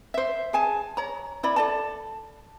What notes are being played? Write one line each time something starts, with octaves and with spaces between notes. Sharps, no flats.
C5 E5
G#4 G#5 A5
C#5 A#5
E4 D5 B5
A4 D5 A5